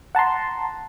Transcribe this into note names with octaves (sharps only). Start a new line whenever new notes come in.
F#5 A5 A#5 C6